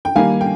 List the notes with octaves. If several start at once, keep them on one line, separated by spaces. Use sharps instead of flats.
G5
D#3 G3 A#3 F5 G#5
G5